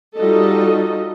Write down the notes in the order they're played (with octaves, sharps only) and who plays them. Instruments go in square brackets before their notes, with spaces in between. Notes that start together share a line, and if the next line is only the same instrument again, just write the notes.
[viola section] G3 D#4 F4 F#4 A4 D#5